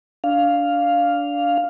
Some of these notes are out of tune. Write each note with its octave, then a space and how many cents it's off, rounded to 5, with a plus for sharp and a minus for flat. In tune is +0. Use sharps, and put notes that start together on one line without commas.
D4 -20 F5 +0